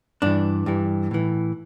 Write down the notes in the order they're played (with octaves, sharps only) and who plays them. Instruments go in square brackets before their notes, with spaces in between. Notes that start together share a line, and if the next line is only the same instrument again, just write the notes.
[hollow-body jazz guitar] G2 E3 D4
G2 E3
A2 E3